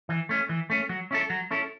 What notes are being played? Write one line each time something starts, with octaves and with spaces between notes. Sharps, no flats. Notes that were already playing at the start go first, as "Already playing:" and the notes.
E3
A3 C#4
E3
A3 C#4
F#3
C#4 E4 A4
F#3
C#4 E4 A4